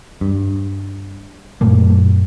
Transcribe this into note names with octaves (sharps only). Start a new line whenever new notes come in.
G2
F#2 A#2 A3 A#3